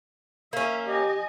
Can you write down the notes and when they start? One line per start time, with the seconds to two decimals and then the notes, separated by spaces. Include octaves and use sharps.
0.53 A#3 C#4 E5
0.87 G4 D#5 G#5